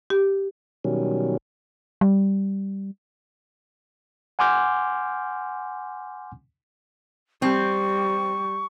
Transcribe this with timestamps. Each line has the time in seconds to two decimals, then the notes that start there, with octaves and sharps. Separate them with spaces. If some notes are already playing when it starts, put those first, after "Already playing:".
0.10 G4
0.84 B2 D#3 F#3 G3 C#4
2.01 G3
4.39 F#5 G#5 C6 D6 F6 G6
7.42 G3 C4 C#6